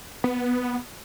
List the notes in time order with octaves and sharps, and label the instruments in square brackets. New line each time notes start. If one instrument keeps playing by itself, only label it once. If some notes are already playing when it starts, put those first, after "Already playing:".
[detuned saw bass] B3